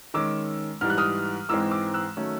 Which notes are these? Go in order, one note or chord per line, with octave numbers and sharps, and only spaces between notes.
D#3 G#3 C#4 D6 E6
G#2 E3 G3 F6
F#6
D#6 F6
G#2 E3 G#3 C4 D6 E6
D6 E6
E6 F#6
D#3 F#3 A3 C#4